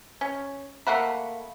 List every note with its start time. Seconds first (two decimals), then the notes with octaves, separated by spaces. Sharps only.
0.21 C#4
0.87 A3 A#3 F#5 B5